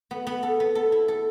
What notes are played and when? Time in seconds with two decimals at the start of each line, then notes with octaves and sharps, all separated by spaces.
0.11 B3
0.27 B3
0.43 A4
0.60 B3
0.75 A4
0.92 E4
1.08 A4